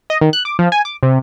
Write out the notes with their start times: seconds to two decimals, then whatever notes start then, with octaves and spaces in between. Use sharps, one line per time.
0.10 D#5
0.21 D#3
0.33 F#6
0.45 D6
0.59 F3
0.72 G#5
0.85 D6
1.03 C3